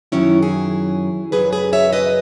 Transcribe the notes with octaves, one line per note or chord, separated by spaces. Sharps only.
F#2 D#3 F#3 C#4 E4
E4 G#4
F#2 C#3 F#3 G#4 B4
G#4 B4
C#5 E5
B4 D#5